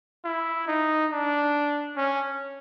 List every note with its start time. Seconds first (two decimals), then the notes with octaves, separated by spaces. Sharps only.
0.24 E4
0.67 D#4
1.11 D4
1.96 C#4